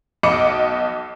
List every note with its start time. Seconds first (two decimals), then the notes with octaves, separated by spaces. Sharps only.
0.23 B1 D#5 D6 C#7